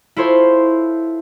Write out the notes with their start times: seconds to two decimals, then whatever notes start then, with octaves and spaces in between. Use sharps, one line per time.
0.16 E4 F4 A4 C5 C#5